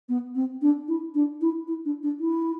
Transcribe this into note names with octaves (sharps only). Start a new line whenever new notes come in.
B3
C4
D4
E4
D4
E4
E4
D4
D4
E4